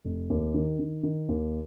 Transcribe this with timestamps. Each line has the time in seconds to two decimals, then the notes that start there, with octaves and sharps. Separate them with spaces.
0.04 F1
0.30 D#2
0.54 D#3
0.79 D#3
1.03 D#3
1.28 D#2